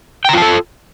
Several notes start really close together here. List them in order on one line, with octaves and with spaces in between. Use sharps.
G5 A#5 F4 A5 A4